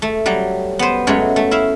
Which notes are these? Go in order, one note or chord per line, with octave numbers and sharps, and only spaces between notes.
A3
F#3 G3
B3 C5
F#2 F#3 G#3 A3 C#5
A3
E4 E5 F5